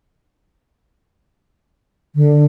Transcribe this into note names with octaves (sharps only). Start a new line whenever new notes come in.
D3